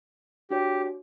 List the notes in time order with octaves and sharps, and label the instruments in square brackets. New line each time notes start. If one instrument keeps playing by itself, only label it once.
[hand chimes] D4 F#4 C#5 [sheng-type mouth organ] G4